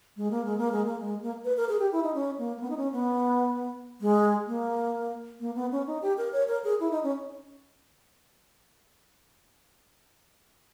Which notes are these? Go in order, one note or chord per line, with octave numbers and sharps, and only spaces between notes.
G#3
A#3
G#3
A#3
G#3
A#3
G#3
A#3
B4
A#4
G#4
G4
E4
D#4
C#4
A#3
A#3
B3
D#4
C#4
B3
G#3
A#3
A#3
B3
C#4
D#4
G4
A#4
C#5
A#4
G#4
E4
D#4
C#4